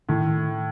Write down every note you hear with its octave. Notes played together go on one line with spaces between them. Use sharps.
A2 D#3